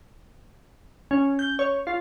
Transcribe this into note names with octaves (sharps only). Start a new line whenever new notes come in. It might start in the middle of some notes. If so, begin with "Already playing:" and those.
C#4
G6
C#5
F4